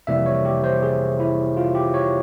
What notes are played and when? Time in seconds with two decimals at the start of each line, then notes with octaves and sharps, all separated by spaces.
0.07 F2 C3 E3 G3 A#3 E5
0.26 C#5
0.45 G4
0.64 C5
0.82 G#4
1.20 E4
1.57 F4
1.75 G4
1.94 C#5